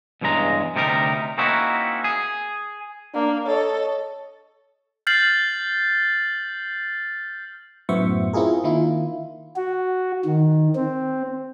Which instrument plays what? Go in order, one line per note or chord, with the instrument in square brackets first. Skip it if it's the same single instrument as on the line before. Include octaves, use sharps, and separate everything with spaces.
[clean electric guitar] E2 G2 C#3 G#3 A#5
D2 C3 G3 D#4 G#4 A#4
A#3 C4 C#4 D#4 E4 F#4
G#4
[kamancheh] A#3 [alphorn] D4
[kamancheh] A4 D#5 [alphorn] C#5
[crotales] F6 G6 A6 C7 F#7
[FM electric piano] F#2 A2 B3 C5 E5 C#6
C4 E4 F4 G#4 A#4
D#3 A#3 E4 F4
[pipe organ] F#4
D#3
C4